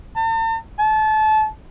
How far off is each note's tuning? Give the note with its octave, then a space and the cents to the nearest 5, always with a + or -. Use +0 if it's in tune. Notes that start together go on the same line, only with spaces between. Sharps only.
A5 +45
A5 -25